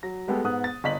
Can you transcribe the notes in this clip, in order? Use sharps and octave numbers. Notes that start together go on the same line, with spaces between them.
F#3 A#6
G3 G#3 B3 G4 A4
G#2 B3 D#6 F#6
A6
G1 D#5 B6 F#7